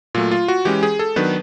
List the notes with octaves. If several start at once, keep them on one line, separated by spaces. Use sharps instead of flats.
A#2 F#3 A3 F4
F4
F#4
E3 G#3 C#4 G4
G#4
A4
D#3 F#3 B3 D4 B4